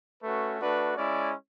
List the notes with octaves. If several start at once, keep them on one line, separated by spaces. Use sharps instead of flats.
A3 C#4 F#4 B4
A3 D4 F#4 B4
G#3 C#4 E4 D5